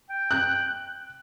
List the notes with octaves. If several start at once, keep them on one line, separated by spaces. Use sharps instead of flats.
G5
F#6